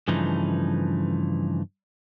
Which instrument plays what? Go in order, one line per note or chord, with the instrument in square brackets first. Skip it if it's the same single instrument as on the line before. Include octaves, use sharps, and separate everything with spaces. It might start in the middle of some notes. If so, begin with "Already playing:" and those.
[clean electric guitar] G2 C#3 E3 F3 A3 D#4